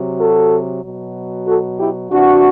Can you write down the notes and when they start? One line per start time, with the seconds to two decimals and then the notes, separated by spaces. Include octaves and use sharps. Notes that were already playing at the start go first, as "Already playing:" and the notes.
Already playing: C3 F#3
0.19 F#4 A4
0.83 B2 F#3
1.47 F#4 A4
1.79 E4 G4
2.11 C3 E3 D4 F#4